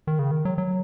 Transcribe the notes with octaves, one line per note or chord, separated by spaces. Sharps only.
D#3
C#3
D#3
F#3
F#3